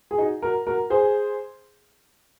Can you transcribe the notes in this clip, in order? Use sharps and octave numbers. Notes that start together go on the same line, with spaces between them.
G#4
D#4 F#4
F#4 A#4
F#4 A#4
G#4 C5